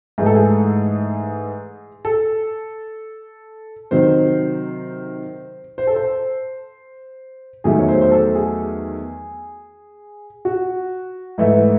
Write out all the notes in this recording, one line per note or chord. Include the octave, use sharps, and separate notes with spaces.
G#2 E3 A3 G#4
A4
G#4
A4
C3 D#3 F#3 C5
C5
A4
C5
E2 D#3 F#3 A3 G#4
C#5
C5
C5
A4
G#4
F#4
G#2 E3 A3